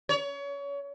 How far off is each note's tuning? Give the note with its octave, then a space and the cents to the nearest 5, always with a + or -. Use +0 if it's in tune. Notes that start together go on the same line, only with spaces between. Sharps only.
C#5 +30